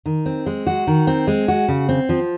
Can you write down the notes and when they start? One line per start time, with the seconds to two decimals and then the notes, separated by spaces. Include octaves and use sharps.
0.06 D#3
0.26 C4
0.46 G#3
0.67 F#4
0.87 D#3
1.07 C4
1.27 G#3
1.48 F#4
1.68 C#3
1.89 C4
2.09 F3